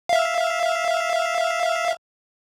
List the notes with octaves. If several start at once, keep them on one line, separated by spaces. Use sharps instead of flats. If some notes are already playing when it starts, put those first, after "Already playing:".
E5 F5